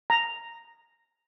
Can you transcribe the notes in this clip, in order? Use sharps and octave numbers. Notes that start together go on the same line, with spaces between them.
A#5